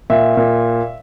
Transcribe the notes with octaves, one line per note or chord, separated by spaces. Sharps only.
A#2 E5
A#2